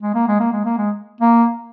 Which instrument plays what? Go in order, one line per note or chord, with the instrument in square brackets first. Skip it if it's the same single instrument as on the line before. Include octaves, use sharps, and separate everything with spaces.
[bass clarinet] G#3
A#3
G#3
A#3
G#3
A#3
G#3
A#3